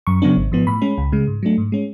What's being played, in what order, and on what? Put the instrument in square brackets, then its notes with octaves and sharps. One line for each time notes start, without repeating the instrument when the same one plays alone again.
[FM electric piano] F#2 C#6
C#3 F#3 B3 D4
G#1
G#2 F3 B3
A2 B5
G#3 C#4
C#2
C#3 G#3
G#2
F#3 A3 D4
G#2
G#3 C#4